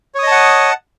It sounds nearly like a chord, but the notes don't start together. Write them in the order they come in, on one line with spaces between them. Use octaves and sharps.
C#5 D#6 D#5 A5 F#5